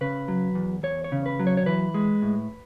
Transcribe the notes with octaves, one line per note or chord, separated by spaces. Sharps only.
C#3 B4
F#3
E2
E2 C#5
C#5
C#3
B4
F#3
C#5
C#5
E3 B4
G#3
A2